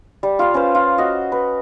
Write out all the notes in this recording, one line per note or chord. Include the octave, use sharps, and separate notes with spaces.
G3
F4 F5
C#4 B4 C5
F4
F#4 D#5
B4